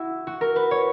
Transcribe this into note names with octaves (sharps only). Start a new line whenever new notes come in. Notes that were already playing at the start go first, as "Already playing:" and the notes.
Already playing: E4 F#4
F#4
A#4
B4
C#5